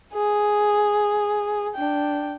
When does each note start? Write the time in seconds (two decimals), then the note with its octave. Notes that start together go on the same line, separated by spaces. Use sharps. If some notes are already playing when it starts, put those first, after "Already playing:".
0.13 G#4
1.75 D4 G5